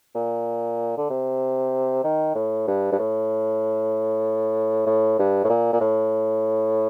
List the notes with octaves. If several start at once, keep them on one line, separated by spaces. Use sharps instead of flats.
A#2
D3
C3
D#3
A2
G2
G2
A2
A2
G2
A2
A#2
A#2
A2